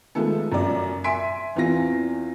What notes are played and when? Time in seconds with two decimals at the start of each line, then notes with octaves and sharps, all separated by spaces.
0.15 D#3 F3 G#3 A3 B3 A4
0.52 F#2 F3 D5
1.04 E5 G#5 C6 B6 D7
1.55 E2 E3 C4 F4 A#6